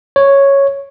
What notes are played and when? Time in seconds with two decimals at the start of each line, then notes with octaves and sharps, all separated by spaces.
0.16 C#5